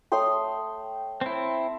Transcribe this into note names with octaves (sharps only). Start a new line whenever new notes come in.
A3 C#5 G5 C6 D#6
C4 E4